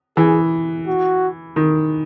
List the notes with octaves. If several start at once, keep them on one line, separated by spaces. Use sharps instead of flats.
E3 G#4
F#4
D#3